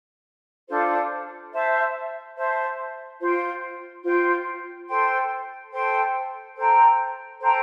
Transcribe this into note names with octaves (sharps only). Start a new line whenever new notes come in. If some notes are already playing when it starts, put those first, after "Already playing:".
D4 F4 A4 C5
C5 E5 A5
C5 E5 A5
F4 C5 G5
F4 C5 G5
A4 C5 G5 C6
A4 C5 G5 C6
A4 C5 G5 A#5
A4 C5 G5 A#5